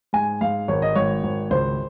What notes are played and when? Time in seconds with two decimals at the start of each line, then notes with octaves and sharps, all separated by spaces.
0.13 G#2 G#5
0.41 G#2 F5
0.68 G#1 C#5
0.82 D#5
0.96 G#1 C#5
1.24 G#1
1.51 C#2 C5